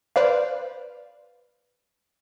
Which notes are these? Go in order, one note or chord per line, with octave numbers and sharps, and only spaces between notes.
B4 C5 D5 F5